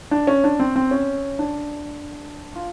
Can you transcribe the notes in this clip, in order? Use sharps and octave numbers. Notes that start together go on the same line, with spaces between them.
D4
C#4
D4
C4
C4
C#4
D4
F4